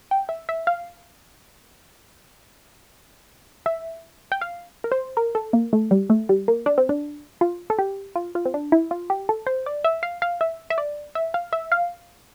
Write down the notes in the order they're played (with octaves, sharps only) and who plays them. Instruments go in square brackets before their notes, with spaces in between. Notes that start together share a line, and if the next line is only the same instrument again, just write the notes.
[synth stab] G5
E5
E5
F5
E5
G5
F5
A#4
C5
A#4
A4
A#3
A3
G3
A3
G3
A#3
D4
C4
D4
F4
A4
G4
F4
F4
C4
D4
E4
F4
G4
A4
C5
D5
E5
F5
F5
E5
E5
D5
E5
F5
E5
F5